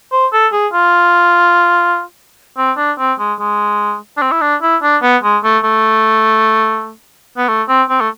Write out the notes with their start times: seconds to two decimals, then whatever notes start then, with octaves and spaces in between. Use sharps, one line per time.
0.12 C5
0.33 A4
0.53 G#4
0.73 F4
2.57 C4
2.77 D4
2.99 C4
3.19 G#3
3.39 G#3
4.17 D4
4.22 C4
4.31 E4
4.41 D4
4.62 E4
4.83 D4
5.02 B3
5.23 G#3
5.44 A3
5.64 A3
7.37 B3
7.48 A3
7.68 C4
7.90 C4
8.01 A3